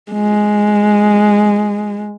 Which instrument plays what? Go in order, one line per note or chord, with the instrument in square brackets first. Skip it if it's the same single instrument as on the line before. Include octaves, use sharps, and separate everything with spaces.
[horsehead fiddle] G#3